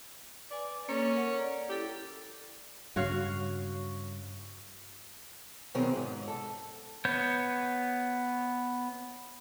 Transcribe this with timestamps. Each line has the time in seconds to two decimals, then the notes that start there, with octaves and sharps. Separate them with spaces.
0.51 B4 D5 G#5
0.89 A#3 C#4 A4 C#5
1.12 A#4 F#5
1.38 D5 A#5
1.69 E4 G4 A4
2.96 G2 C#3 F#4 C#5 F5
5.75 B2 D#3 F#3 C4 G#4 A#4
5.92 E2 G#2
6.28 A4
7.05 B3 C#5 G6